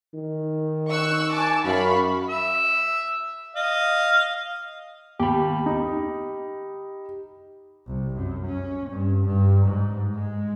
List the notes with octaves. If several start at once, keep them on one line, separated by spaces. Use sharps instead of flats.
D#3
C#6 E6 F#6
G#5 A5 D6
F#2 F5 B5 C#6
E5
D#5 F5
D#2 G4 B5
D#4
C2
F#2
C#4
G2
G2
G#2
G#3